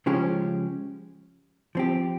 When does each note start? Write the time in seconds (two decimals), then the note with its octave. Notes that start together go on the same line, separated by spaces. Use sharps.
0.06 C#3 F3 G#3 C#4 G4
1.75 F3 C4 G4